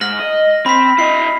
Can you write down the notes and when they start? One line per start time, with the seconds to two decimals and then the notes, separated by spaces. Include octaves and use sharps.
0.01 G#2 F6 A#6 F#7
0.20 D#5
0.66 C4 B5 B6
0.99 E4 D#5 C7